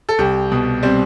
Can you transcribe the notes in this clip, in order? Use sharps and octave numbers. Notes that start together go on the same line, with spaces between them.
A4
C2 G4
B2
G3 C4